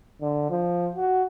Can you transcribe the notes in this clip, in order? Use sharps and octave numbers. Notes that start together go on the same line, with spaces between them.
D3
F3
F#4